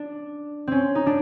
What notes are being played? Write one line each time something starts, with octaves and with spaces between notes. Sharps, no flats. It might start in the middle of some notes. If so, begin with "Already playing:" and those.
Already playing: D4
C4 C#4
D#4
D4